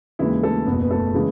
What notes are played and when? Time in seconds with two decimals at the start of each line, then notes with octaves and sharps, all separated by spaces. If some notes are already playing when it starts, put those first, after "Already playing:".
0.19 D#2 C#3 E3 G#3 E4
0.43 A3 A4
0.66 F#1 E2 B2 B3 B4
0.81 B4
0.91 A3 A4
1.14 C#3 E3 G#3